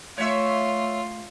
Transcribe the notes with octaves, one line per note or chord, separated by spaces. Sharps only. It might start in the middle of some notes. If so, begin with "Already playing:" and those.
A3 F4 C#5 E5